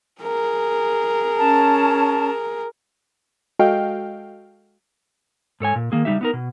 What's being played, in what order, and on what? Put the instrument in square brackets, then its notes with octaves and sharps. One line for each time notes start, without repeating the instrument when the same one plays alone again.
[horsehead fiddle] G#4 A#4
[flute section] C#4 A5
[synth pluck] G#3 F#4 A4 D#5 F5 G5
[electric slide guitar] G#2 A4 C#5 G#5
A#2
D#3 A#3 G#4
C#3 G3 A#3 D#4 G4 E5
B3 D#4 A#4
B2